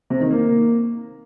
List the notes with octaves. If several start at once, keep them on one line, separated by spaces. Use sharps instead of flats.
C3
D#3
A#3